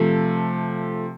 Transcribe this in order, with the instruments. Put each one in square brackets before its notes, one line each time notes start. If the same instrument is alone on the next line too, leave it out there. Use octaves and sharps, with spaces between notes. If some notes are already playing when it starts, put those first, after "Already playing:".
Already playing: [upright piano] C3 F3 A3